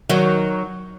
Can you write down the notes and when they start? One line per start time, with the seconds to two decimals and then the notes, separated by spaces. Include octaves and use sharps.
0.10 D#3 F#3